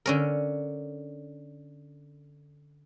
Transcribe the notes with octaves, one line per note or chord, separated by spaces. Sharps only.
D3 C#4 A#4